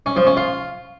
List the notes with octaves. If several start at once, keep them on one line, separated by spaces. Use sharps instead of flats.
C#4
F3
C#4
F4